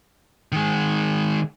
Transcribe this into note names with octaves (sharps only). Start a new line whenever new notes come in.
D#3 G#3